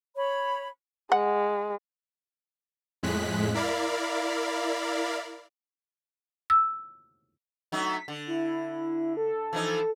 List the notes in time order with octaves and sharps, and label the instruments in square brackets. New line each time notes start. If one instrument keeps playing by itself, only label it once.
[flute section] C#5 B5
[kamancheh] G#3 [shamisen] F#5
[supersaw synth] F2 A2 G#3 F#6 B6
E4 A#4 D5 F5 B5
[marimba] E6
[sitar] F#3 A3 D#4 [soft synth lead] B6
[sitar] D3
[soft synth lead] E4
A4
[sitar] E3 F3 D#4